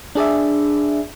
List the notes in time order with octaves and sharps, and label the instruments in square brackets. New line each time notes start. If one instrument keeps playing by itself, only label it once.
[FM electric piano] D4 G#4 D5 E5